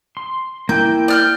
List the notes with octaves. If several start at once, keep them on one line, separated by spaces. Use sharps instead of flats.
C6
A#3 E4 G5 G6
D5 F6 G6